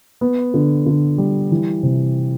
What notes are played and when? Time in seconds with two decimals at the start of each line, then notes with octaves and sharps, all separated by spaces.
0.21 B3
0.54 D3
0.86 D3
1.18 G3
1.51 E3
1.83 C3